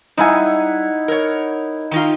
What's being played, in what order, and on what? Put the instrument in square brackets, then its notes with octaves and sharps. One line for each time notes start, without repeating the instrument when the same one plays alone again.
[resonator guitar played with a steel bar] G3 G#5 [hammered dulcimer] D#4 E4 F#5
[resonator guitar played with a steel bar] A#4 C#5
D#3 D#4 F4